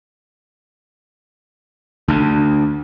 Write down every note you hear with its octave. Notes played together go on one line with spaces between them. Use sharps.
D2